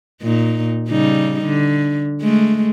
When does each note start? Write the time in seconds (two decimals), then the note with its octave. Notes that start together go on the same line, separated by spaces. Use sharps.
0.22 A#2 D#4
0.89 C#3 G3 D#4
1.45 D3
2.21 G#3 A3